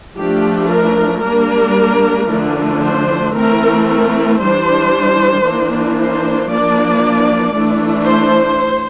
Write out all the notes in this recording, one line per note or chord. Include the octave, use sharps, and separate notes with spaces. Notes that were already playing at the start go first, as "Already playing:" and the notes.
F3 A3 D4 G4
A#4
G3 A#3 D4 A#4
D3 F3 A3 D4
C5
E3 A3 C4 A#4
A#4
E3 G3 D4 C5
E3 A#3 D4
C5
F3 A#3 D4 D5
E3 A3 D4
C5